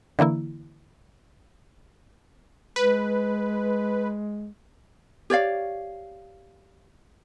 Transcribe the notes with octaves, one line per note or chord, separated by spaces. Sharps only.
D3 E3 A#3 E4
G#3 B4
G4 C#5 D5 F5